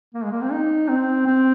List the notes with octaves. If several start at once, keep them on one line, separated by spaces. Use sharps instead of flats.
A#3
G#3
A#3
C4
D#4
C4
C4